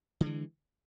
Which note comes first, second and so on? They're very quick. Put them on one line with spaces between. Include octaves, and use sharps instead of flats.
D3 G#3 E3